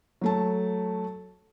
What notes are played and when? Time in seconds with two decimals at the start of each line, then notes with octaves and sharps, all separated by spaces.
0.21 F#3 A3 A5